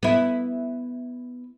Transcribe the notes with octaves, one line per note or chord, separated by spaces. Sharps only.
B3 E4